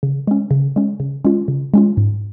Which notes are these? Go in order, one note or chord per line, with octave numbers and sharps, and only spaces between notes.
C#3
G#3 C#4
C#3
G#3 C#4
C#3
G#3 C#4 F4
C#3
G#3 C#4 F4
G#2